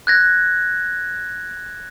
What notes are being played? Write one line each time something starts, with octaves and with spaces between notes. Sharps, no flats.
F#6 G#6 A#6